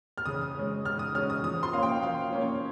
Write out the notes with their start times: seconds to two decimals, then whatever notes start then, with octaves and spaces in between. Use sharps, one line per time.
0.18 F6
0.26 C#3 D#6
0.55 G#3 C#4
0.85 C#3 F6
0.99 D#6
1.14 G#3 C#4 F6
1.30 D#6
1.43 F3 D#6
1.63 C6
1.73 A#3 C#4 F5
1.83 G5
2.02 F3 F5
2.33 A#3 C#4
2.41 C#5